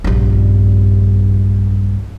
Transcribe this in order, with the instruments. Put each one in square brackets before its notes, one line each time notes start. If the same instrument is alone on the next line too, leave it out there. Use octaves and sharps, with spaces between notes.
[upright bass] A#1 G2